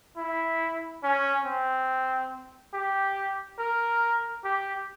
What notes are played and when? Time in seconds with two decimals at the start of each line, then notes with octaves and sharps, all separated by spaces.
0.17 E4
1.03 C#4
1.45 C4
2.74 G4
3.59 A#4
4.44 G4